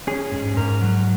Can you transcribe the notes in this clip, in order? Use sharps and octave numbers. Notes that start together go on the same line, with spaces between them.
C#4 G#4
G#2
G#2 A#4
F#3